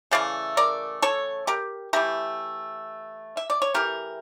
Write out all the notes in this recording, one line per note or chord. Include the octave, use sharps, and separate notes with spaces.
C#3 E3 A3 D5 F5
A#4 D5
A4 C#5
G4 A#4
E3 A3 G4 A#4
E5
D5
C#5
E3 A3 G4 A#4